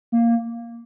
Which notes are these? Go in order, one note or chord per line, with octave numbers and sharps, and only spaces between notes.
A#3